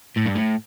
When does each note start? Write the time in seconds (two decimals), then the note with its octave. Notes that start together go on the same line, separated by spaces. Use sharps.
0.17 A2
0.26 G2
0.36 A2